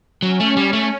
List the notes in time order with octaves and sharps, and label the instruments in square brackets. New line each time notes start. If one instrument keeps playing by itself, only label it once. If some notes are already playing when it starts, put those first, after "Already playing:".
[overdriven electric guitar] F#3 [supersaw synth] C#4
[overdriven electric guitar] A3
G3
A3